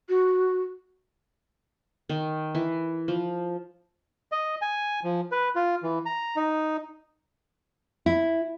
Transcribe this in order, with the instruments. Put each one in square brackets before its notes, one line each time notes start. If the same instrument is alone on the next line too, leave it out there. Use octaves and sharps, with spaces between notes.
[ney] F#4
[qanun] D#3
E3
F3
[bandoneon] D#5
G#5
F3
B4
F4
E3
A#5
D#4
[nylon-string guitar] E4